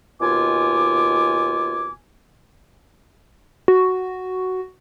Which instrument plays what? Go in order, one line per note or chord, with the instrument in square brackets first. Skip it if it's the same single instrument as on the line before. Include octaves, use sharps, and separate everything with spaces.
[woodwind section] D#2 B2 F4 G#5 D6
[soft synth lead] F#4